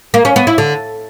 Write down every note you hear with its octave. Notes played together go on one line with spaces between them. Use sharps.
A#3
C#4
B3
E4
D3